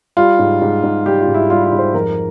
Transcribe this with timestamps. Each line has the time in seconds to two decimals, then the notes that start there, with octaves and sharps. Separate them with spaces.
0.17 G3 F4
0.39 G#2
0.62 G#2
0.83 G#2
1.06 G3 G4
1.21 F4
1.27 G#2
1.34 E4
1.50 G3 F4
1.65 F4
1.72 G#2
1.79 C5
1.94 F2 A#4